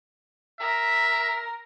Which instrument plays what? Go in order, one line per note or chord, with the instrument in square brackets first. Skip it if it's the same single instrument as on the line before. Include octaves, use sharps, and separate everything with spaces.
[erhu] A#4 [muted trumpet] E5